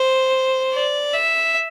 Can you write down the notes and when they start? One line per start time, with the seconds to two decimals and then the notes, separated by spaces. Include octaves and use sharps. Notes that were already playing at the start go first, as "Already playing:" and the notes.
Already playing: C5
0.73 D5
1.14 E5